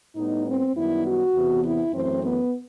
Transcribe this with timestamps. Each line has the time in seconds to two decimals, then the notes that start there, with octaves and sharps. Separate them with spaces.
0.16 A2 G3 B3 D#4
0.46 C4
0.75 F#2 D#3 G3 B3 E4
1.04 F#4
1.34 E2 C3 E3 B3
1.64 E4
1.93 F#2 E3 A3 C4
2.22 B3